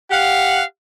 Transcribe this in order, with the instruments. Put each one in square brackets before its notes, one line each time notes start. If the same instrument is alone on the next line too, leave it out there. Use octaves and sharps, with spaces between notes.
[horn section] G4 F5 F#5